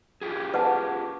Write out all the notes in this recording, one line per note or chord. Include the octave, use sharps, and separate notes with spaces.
F4 G4 G#4
B4 F#5 A5